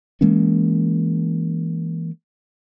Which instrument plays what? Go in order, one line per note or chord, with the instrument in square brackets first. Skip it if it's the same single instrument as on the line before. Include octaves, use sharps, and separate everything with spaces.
[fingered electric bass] E3 G#3 A#3 C#4